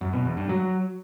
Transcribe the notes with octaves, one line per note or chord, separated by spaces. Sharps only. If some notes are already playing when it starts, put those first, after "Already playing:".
F#2
B2
E2
G2
F#3